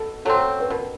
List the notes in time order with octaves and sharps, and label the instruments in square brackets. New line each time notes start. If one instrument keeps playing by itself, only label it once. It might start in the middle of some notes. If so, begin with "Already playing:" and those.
Already playing: [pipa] B2 [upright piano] A4
[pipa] F#3 A3 C4 [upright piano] A4
[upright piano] B4
[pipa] B2 [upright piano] A#4